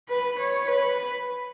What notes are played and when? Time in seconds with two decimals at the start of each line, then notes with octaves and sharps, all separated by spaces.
0.08 B4
0.38 C#5
0.67 B4